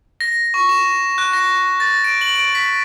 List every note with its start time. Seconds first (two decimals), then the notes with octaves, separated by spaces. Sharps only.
0.21 A#6
0.54 C#6
0.69 E7
1.18 F#6
1.33 A#6
1.80 A6
2.04 D7
2.21 F#7
2.36 D7
2.55 B6